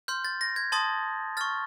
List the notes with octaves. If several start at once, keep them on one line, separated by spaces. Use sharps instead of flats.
C6 F6 G6
A6
A#6
G#6
A5 C6 D#6 A6
C#6 F6 A6